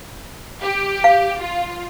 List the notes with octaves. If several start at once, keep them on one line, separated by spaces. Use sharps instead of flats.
G4
F5
F4